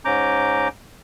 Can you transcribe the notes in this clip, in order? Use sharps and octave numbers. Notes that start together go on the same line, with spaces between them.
G#2 C#4 A#5 D6 G6